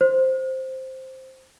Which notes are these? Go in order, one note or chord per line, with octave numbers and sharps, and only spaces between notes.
C5